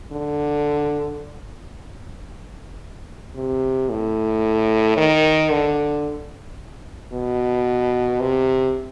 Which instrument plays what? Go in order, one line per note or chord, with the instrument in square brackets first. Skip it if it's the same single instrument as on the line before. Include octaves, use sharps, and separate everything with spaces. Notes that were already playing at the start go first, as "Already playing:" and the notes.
[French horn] D3
C3
A2
D#3
D3
B2
C3